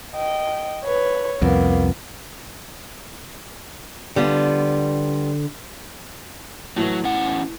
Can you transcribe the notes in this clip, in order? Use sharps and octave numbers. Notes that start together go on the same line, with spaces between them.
D#5 G5
B4 C#5
C2 F2 A#3 B3
D3 G3 B3 F4
A2 E3 F#3
E2 C#4 F#5